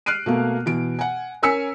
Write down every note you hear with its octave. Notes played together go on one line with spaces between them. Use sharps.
F6 F#6 C7 D7 D#7
B2 A3 A#3
B2 E3 D7
F#5 G#5
C#4 A#4 G#5 E6 B6 C#7